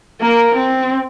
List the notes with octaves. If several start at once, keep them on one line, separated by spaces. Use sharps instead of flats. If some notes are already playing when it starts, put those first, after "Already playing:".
A#3 A#4
C4